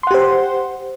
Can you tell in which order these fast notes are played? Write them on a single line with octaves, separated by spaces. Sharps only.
C6 F#5 G4 C5